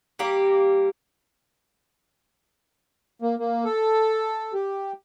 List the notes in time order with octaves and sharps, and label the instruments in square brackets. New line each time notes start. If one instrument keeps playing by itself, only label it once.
[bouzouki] G3 A#3 G4
[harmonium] A#3
A#3
A4
G4